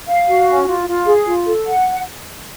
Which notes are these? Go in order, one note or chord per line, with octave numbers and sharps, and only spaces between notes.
F5
F#4
C#4
F4
F4
G#4
F4
A4
F#5